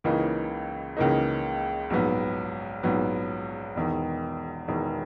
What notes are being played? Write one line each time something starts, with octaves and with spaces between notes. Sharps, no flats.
C#2 C#3 E3 A#3 D#4
C#2 C#3 E3 A#3 D#4
A#1 G#2 F#3 B3
A#1 G#2 F#3 B3
E1 E2 D#3
E1 E2 D#3